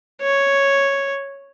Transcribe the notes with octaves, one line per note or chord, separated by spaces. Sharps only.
C#5